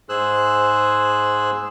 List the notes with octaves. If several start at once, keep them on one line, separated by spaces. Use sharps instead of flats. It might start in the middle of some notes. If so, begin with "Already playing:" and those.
G#2 G#4 C5 E6 F#6